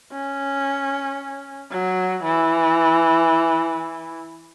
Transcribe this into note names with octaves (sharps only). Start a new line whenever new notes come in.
C#4
F#3
E3